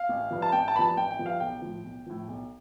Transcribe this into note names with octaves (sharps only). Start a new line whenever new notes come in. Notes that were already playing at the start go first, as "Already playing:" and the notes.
Already playing: F5
A1
G2 F3
A5
A1 G5
A5
G2 F3 A5 B5
A1 G5
G5
G2 F3
F5
B1 G5
A2 F3
B1
A2 F3
B1